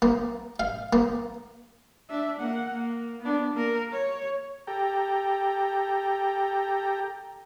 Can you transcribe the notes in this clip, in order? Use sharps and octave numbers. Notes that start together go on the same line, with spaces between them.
A#3
F5
A#3
D4 E5
A#3 F#5
A#3
B3 D4
A#3 A#4
C#5
G4 A4 G5 A#5